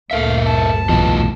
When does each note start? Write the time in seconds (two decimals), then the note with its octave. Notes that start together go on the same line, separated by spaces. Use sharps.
0.11 G1 D2 A#2 A4 A#4 E5 F5
0.46 A5
0.89 B1 E2 A2 F4 D#5